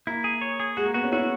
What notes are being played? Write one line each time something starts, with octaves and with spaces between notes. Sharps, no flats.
A#3 E4
G#4
C#5
G#4
G#3 F#4
A#3
B3 F#4
C#4
E4 F#4